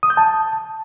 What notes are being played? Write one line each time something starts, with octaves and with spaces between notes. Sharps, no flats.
D#6
G6
A5